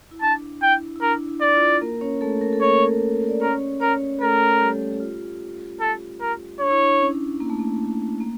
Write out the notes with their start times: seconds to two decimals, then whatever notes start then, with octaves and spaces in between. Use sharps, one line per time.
0.11 E4
0.21 D4 A5
0.62 E4 G5
0.96 E4
1.01 D4 A#4
1.29 E4
1.41 D5
1.55 F4
1.81 A#3 A#4
2.01 C#4 C#5
2.21 A3 A4
2.41 A#4
2.53 A4
2.61 A#3 A#4 C#5
3.29 D5
3.41 C#4 A#4 C#5
3.81 C#4 A#4 C#5
4.21 A3 A4 A#4
4.61 G3 G4
4.92 G4
5.00 F4
5.81 A4
6.21 A#4
6.60 D4 C#5
6.71 E4
6.82 D4
7.00 C#4
7.40 A#3
7.50 A3
7.59 A#3
8.20 A#3